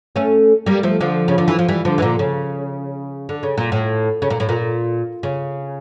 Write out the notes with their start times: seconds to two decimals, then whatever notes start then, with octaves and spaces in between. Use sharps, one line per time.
0.16 A3 C#4
0.66 G3 A#3
0.83 F3 A3
1.01 D3 F3
1.28 C#3
1.38 D3
1.48 E3
1.59 F3
1.68 E3 G3
1.85 D3 F3
1.98 E3
2.02 A#2 D3
2.19 C#3
3.29 D3
3.43 C#3
3.58 A#2
3.72 A2
4.22 C#3
4.30 A#2
4.40 A2
4.49 A#2
5.23 C#3